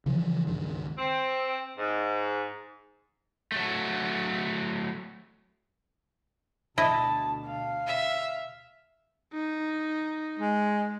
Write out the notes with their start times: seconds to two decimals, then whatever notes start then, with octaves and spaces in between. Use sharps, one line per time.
0.06 C#3 E3 F3
0.47 C#2 G2 D#3
0.98 C4
1.78 G#2
3.52 F#3 A3
6.78 D2 B2 E4 D#5 A5
7.47 F5
7.87 E5
9.33 D#4
10.39 G#3